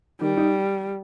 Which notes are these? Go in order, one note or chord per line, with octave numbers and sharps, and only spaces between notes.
D#3 G3
D#4